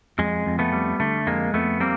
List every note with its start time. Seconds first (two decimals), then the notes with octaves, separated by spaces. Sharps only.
0.19 F2 G#3
0.46 F2
0.59 A3 B3
0.73 G3
1.00 D3 A3
1.27 F2 G#3 A#3
1.54 F2 A3 B3
1.80 G3 A#3 C4